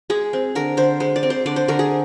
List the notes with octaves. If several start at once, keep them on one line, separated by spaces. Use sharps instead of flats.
G#3 G#4
C4
D3 A#4
D3 C5
G#3 C5
D5
C4
C5
D3 D5
C5
D3 A#4
G#4